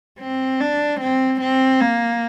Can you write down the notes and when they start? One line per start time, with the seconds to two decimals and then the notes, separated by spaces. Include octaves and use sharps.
0.19 C4
0.61 D4
1.00 C4
1.40 C4
1.81 A#3